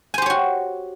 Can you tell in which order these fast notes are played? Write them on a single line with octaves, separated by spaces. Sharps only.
G#5 C5 G4 C#5 F#4